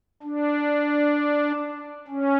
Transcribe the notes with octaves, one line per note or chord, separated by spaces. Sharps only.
D4
C#4